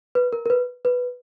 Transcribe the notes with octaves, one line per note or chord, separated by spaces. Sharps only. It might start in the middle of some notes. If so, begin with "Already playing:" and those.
B4
A#4
A#4
B4
B4